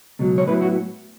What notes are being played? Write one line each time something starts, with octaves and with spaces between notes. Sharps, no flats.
C#2 B2 F#3
C#5
A2 F#3 B3 E4 B4
F#4